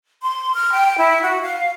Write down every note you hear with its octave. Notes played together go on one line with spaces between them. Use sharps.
C6
F6
G5
E4
F#4
F5